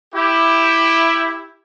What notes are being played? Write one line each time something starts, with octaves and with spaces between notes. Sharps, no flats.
E4 G4